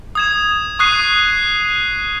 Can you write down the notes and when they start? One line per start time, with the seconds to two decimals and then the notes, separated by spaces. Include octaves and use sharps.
0.15 D#6 G#6 E7
0.79 C#6 D#6 F#6 C7 D#7